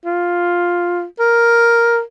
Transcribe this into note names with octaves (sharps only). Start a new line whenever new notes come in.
F4
A#4